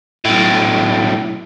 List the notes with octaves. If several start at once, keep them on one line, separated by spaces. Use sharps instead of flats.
B1 A2